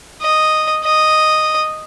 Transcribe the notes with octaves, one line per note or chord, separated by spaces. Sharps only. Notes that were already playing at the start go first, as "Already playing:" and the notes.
D#5
D#5